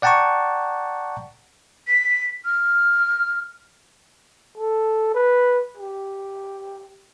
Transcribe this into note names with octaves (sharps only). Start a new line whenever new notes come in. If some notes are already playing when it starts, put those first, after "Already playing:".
D5 F#5 G5 A5 A#5 C#6
B6
F6
A4
B4
G4